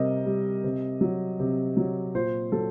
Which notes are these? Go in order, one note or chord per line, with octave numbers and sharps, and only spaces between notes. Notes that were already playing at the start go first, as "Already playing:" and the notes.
Already playing: C3 G3 A#4 D#5
G3
C3
F#3
C3
F#3
A#2 C5
F#3 A4